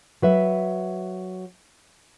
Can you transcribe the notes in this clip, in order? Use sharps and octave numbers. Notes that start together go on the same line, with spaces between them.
F#3 B4 E5